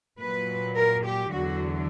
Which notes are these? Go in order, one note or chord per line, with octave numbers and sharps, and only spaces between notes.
A#2 F#3 B4
A#4
G4
E2 D3 F#3 F#4